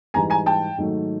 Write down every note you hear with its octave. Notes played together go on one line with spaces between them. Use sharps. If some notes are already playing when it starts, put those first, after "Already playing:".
G#2 E3 G3 G#5 A#5
G#5 A#5
G5 A5
G#2 D#3 F#3 A3